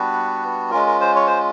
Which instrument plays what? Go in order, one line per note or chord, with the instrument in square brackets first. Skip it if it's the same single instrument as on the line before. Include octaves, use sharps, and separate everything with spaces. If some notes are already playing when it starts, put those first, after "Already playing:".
Already playing: [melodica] G3 B3 D4 F#4 B4
G#3 C#4 F4 A#4
A#4
C5
C#5
C5